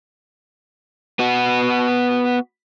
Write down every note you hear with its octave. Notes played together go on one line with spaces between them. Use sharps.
B3 F#4